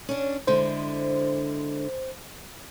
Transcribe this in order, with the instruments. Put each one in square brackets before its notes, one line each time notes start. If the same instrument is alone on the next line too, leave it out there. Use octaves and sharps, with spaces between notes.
[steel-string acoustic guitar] C#4 D4
[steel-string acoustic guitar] D3 G#3 E4 [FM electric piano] C5